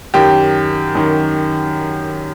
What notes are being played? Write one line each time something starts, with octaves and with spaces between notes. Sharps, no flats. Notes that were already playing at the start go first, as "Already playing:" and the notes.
F#2 D#3 G4
F#2 D#3